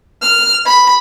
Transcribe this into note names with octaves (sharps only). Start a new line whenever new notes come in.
F6
B5